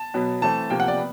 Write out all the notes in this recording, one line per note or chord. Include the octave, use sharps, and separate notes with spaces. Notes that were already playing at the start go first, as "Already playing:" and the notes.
Already playing: A5
B2 F#3 B3
E3 A3 C4 A5
C3 F3 A#3 G5
F#5
D5
B3